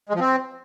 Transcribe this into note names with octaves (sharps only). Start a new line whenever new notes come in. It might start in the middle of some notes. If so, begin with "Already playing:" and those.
G#3
F3
C4